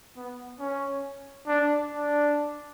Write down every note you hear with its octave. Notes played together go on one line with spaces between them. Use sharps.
B3
C#4
D4
D4